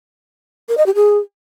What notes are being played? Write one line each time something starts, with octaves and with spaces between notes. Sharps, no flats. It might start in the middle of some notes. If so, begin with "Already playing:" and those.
A#4
D#5
G4
G#4